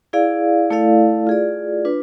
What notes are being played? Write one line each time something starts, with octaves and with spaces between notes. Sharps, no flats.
E4 G#4 D5 F5
A3 E4 A4 D5 F5
F4 G#4 D5
D4 F4 B4